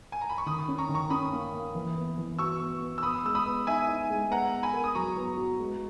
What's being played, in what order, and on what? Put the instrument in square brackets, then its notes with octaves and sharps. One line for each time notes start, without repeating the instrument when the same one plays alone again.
[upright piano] G#5
A#5
B5
C#6
[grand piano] D#3 [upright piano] B5 D#6
[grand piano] C#4
[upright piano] A#5 C#6
[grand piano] D#3
[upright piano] A#5 C#6
[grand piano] C#4 [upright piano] B5 D#6
[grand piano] A#3
A#3
E3
B3
E3
[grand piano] F#4 [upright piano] C#6 E6
[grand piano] B3
B3
[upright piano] E6
[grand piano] B3 [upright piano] B5 D#6
[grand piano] G#3 [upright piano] E6
[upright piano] B5 D#6
[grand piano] B3
[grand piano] D#4 [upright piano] E5 G#5
[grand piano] D#4
G#3
[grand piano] B3 [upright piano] F#5 A#5
[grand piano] B3
[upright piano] G#5 B5
[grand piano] A#4
[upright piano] D#6
[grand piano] F#3 [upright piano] A#5 C#6
[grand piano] B3
F#4
G#3